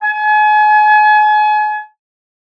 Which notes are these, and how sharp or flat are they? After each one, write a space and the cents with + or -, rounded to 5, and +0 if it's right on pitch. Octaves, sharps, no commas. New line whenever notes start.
G#5 +35